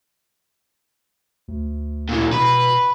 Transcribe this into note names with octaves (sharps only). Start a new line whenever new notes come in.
D2
A#2 E3
B2 B4